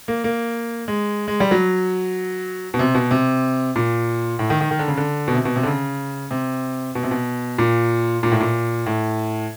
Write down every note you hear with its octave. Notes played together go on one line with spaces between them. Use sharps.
A#3
A#3
G#3
G#3
G3
F#3
B2
C3
B2
C3
A#2
A2
D#3
D#3
D#3
D3
C#3
D3
B2
C3
B2
C3
D3
C#3
C3
B2
C3
B2
A#2
A#2
A2
A#2
A2